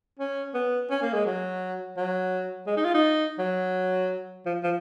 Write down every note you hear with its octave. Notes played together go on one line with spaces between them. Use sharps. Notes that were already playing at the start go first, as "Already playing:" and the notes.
C#4
B3
C#4
A#3
G#3
F#3
F#3
G#3
D#4
F4
D#4
F#3
F3
F3